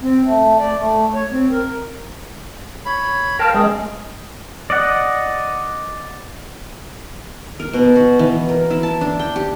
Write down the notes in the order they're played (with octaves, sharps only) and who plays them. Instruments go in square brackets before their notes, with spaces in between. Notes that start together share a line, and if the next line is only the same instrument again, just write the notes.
[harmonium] C4
A3
D5
A3
C#5
C4
A#4
[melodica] C#5 B5
[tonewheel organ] A#4 [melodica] F5 G5 A5
[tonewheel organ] G#3 [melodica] C#4 G#4
[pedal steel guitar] D5 D#5 F#5
[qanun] A#4
B2
F#4
E3
A#4
E4
A5
D4
G5
G4